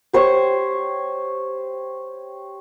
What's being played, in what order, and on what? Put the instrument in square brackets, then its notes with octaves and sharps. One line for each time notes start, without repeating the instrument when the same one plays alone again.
[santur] G4 C5 C#5 C#6